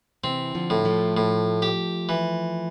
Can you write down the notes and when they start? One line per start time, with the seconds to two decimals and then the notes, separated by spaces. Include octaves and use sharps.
0.24 C3 E3 C4
0.55 D3 F3
0.70 A2
0.85 F3 A3
1.17 A2
1.62 G4
2.09 E3